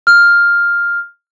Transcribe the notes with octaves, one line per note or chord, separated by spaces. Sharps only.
F6